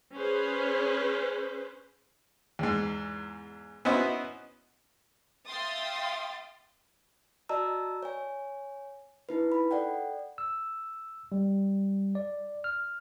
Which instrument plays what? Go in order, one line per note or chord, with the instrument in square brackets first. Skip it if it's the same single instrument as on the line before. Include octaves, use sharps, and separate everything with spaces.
[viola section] C#4 G#4 B4 C5
[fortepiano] E2 G#2
B3 C#4 D#4 E4 F#4 C5
[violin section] E5 F5 G5 C6 D#6 A6
[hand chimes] F#4 D5 D#5 A5 A#5 E6
C#5 G#5
D#4 E4 B4
B5
A4 D5 F#5 G5
[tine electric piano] E6
G3
D5
F6